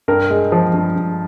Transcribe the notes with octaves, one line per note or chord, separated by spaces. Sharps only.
G2 A#4
G#3
F3
G2
G2